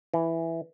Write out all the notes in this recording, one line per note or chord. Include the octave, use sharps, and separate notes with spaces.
E3